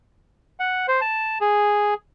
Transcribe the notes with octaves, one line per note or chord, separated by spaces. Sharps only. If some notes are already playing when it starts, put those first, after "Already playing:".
F#5
C5
A5
G#4